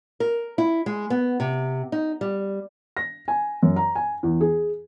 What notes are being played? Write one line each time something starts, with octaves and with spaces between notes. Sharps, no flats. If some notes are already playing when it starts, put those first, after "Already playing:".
A#4
E4
G#3
B3
C3
D#4
G3
A#6
G#5
F#2
A#5
G#5
E2
G#4